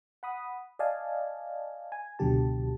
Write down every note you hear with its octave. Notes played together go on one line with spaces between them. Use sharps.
F#5 B5 D#6
D5 D#5 F5 G#5 A5
G#5
C#2 B2 D3 F#3 G4 A5